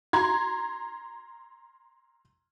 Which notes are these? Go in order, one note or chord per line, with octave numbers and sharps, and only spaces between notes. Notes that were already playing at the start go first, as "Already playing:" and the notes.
A#5 C6 G#6